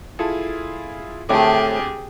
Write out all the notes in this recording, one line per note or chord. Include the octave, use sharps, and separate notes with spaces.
E4 F4 G#4 A4
D2 A2 A3 C4 G4 G#4 D6